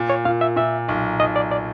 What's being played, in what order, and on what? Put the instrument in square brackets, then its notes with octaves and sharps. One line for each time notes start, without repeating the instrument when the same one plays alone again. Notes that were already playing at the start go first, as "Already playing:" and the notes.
Already playing: [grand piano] A#2
[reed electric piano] C#5
[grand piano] A#2 [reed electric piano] F5
[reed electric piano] E5
[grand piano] A#2 [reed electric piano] E5
[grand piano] B1
[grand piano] B1 [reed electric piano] D#5
[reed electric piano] D5
D5